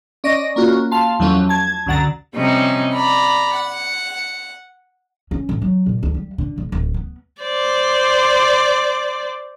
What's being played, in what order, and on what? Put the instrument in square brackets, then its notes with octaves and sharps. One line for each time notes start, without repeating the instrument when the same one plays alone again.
[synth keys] C#4 D5 D#5 A#6
A#3 C#4 F4 F#4
F5 A5 C6
E2 F3 F#3 A3 C#4
A5 G#6
C#2 F#2 D3 F#5 A#5 A6
[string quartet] C3 F3 G3 C#4 D#4
D5 A#5 B5
F#5
[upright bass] C#4
A1
F#3
A#2
D2
G3
D3
D#1
D1
B3
[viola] C5 D5